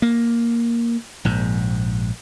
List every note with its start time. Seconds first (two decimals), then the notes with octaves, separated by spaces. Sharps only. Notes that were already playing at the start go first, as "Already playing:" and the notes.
0.02 A#3
1.25 A#1 G#2